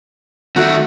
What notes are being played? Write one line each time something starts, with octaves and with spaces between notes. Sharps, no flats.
D#3 A3 F#4